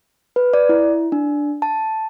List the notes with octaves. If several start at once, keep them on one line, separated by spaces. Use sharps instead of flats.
B4
D5
E4
D4
A5